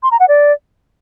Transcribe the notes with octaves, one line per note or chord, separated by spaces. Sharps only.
C6
A#5
F#5
D5